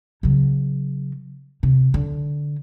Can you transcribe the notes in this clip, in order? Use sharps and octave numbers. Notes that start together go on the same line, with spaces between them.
C#3 F#3
C3
D3